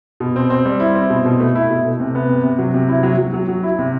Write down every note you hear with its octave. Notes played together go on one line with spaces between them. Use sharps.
B2
C4
C4
G3
E4
C4
B2
B2
A3
E4
B2
A3
C3
B3
C3
C3
F#3
C3
E4
F#3
F#3
F#3
F#3
E4
C3